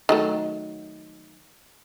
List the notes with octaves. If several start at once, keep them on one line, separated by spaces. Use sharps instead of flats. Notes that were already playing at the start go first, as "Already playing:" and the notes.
D#3 F#3 A3